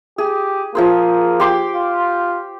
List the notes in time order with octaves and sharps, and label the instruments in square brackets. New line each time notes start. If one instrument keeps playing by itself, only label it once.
[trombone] G4 [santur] G#4
[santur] F3 G#4 C5 [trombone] A#3
[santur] G4 C6 D6
[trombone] F4